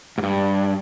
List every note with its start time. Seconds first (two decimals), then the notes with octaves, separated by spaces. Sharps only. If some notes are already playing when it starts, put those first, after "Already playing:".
0.18 G#2
0.23 G2